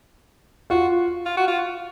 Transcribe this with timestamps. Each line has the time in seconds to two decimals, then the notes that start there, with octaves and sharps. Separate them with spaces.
0.70 F4 F#4
1.26 F4
1.37 F#4
1.48 F4